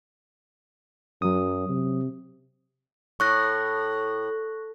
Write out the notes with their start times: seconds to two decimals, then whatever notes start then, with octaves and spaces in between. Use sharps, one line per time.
1.22 F#2 F#3 D#6
1.69 C3
3.20 A2 C#6 F#6 A#6